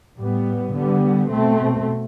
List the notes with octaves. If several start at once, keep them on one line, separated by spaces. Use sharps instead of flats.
A2 G3 B3
D3 G3 B3
B2 A3 C4